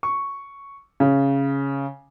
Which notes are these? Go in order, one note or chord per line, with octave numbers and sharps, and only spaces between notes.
C#6
C#3